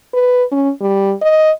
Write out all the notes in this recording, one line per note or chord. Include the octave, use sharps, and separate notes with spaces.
B4
C#4
G3
D#5